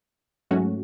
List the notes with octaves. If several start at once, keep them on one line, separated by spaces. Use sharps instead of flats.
G#2 F#3 A3 C#4 F#4